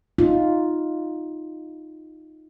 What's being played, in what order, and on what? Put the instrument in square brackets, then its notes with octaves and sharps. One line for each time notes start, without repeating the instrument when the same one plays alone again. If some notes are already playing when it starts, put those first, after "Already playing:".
[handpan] D#4 F4